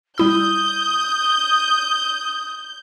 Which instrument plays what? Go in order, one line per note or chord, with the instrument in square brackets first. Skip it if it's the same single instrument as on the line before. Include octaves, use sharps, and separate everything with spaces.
[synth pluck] G3 E4 E6 [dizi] D#6 [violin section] G6